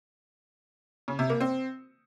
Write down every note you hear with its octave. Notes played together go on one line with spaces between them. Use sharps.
C#3
C3
A#3
C4